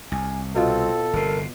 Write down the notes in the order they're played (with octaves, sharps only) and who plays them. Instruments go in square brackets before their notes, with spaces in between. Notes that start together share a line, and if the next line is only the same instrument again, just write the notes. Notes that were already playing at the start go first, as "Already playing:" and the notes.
[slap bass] C2 [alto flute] G#5
[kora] B2 F4 [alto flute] C4 [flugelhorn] A4
[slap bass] G1 C3 [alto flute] A#4